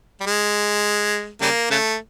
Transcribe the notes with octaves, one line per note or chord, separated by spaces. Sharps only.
G3
G#3
C#3 G3 A#3
C#3 A3